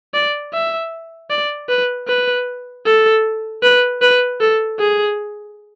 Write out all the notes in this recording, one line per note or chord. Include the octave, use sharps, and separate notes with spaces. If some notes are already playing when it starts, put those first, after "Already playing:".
D5
E5
D5
B4
B4
A4
B4
B4
A4
G#4